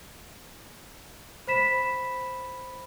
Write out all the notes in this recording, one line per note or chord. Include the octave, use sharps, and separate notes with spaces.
C5 B5 B6 E7